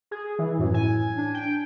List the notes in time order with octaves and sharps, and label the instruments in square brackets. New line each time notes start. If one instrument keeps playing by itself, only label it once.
[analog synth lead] G#4
E3
[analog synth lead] F#2 [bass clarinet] A2
[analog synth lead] G#5
[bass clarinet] D4
[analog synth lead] G5